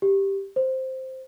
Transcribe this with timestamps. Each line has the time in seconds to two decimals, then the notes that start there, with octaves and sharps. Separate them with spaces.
0.02 G4
0.56 C5